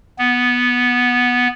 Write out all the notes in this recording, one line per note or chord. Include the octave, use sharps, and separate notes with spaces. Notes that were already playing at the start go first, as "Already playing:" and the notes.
B3